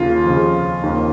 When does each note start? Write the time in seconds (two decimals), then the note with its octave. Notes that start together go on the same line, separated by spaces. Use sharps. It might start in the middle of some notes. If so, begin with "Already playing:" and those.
Already playing: D#2 C#3 F4
0.26 F2 C#3
0.83 D#2 D#3